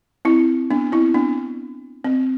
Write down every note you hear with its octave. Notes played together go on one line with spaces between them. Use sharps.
C4 E4
B3 D4
C4 E4
B3 D4
C4